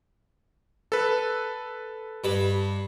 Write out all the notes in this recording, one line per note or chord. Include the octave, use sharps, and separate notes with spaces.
A4 B4
G2 A5 B5